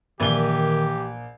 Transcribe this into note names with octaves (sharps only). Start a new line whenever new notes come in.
A#1 D#3 E3 G4 B4 G7